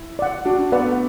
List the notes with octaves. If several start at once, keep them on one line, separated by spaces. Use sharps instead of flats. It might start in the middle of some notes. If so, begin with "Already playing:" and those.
Already playing: E4
D5 F#5
D4 F#4
D4
B3 B4 D5 F#5
A3